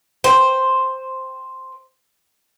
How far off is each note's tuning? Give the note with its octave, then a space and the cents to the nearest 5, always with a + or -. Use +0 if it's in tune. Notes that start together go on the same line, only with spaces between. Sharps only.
C5 +0 G5 +0